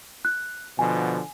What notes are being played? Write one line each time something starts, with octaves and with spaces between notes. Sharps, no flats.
F#6
B2 D3 F3 G#5